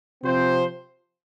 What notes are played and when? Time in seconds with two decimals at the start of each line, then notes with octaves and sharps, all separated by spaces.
0.22 C3 F3 C4 F4 C5